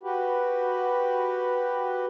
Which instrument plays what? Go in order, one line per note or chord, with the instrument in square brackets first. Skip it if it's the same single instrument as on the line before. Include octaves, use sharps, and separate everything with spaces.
[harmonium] F#4 G4 B4